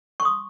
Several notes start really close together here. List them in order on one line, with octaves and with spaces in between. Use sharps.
C#6 C6 D#6